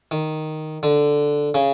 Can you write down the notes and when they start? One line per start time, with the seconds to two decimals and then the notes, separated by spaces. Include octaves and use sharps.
0.11 D#3
0.83 D3
1.54 C#3